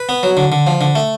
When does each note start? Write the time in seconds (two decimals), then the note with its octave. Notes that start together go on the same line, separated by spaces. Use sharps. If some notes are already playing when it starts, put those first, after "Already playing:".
Already playing: B4
0.09 B3
0.23 F#3
0.37 D3
0.52 D3
0.67 F3
0.81 D3
0.95 A3